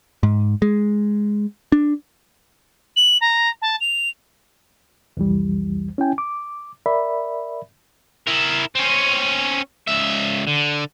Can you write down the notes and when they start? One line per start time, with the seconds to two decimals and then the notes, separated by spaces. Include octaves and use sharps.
0.23 G#2
0.62 G#3
1.72 D4
2.96 F#7
3.21 A#5
3.61 A5
3.80 F7
5.17 C2 F2 E3 G3
5.98 C#4 E4 G5 G#5
6.18 D6
6.86 A#4 D5 E5 B5
8.27 E4 A#4
8.75 C4 C#4
9.88 C#2 E5
10.47 D3